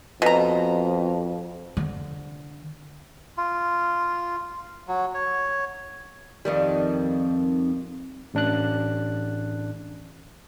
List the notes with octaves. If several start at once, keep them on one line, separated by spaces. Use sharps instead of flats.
F2 B2 A#5
D3
F4
F#3
C#5
F2 D#3 G3
A1 D4 F#6